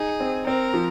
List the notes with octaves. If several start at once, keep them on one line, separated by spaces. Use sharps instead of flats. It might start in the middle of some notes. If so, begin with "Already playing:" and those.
Already playing: D#4 G#4
C4
C4 A#4
F3